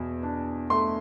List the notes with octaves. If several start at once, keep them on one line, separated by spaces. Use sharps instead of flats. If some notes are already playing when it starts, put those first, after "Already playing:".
Already playing: E2 B2
D4
A3 C6